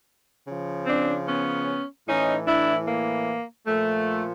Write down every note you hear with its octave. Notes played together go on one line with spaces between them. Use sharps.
C#3 F3
C4 D4
B3 C#4
A2 E3 C#4 D#4
D4 E4
A#3
A#2 F3 A3